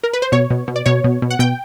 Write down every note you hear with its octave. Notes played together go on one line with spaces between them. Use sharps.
A#4
B4
C5
B2 C#5
B2
B2
D5
B2 C#5
B2
B2
F#5
B2 G5